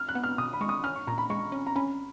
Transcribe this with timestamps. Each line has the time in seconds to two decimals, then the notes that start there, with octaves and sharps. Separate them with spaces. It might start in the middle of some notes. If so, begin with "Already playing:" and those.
Already playing: F6
0.09 F#6
0.15 B3
0.24 F6
0.38 B2 D#6
0.53 B5
0.61 G#3 C#6
0.69 D#6
0.84 C#4 F6
0.96 C#6
1.07 A#2 A#5
1.18 B5
1.30 G#3 C#6
1.52 C#4
1.67 A#5
1.75 C#4 B5